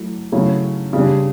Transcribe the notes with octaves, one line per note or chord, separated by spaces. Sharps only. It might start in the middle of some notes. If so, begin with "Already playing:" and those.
Already playing: F#3 A3 E4
C#3 F#3 A3 C#4 E4
C#3 G3 D4